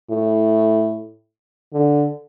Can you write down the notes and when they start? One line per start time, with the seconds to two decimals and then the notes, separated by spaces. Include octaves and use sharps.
0.10 A2
1.73 D3